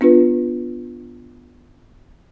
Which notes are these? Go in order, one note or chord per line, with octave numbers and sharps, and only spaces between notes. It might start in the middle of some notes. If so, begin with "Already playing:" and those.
B3 D4 F4 B4